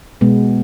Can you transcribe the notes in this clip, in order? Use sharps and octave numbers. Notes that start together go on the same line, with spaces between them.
B2 G#3 B3